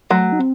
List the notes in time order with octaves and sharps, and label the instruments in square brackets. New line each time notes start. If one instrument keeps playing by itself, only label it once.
[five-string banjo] F#3 [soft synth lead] A3
[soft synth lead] D#4
C4